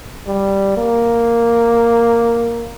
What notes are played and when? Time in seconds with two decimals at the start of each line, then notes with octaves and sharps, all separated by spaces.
0.27 G3
0.77 A#3